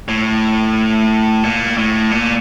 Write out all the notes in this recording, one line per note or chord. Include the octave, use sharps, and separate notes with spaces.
A2
A#2
A2
A#2